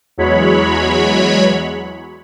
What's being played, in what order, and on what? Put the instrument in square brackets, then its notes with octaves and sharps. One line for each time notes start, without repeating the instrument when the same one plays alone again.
[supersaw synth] E2 F#3 G#3 C#5 B5